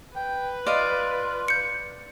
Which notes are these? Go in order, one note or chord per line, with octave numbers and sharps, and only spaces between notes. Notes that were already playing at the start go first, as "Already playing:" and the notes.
B4 G5
F4 D5 D#5 F5
G6 C#7